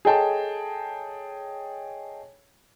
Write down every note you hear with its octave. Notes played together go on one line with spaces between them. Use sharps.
G#4 A4 C#5 D#5 G5 A5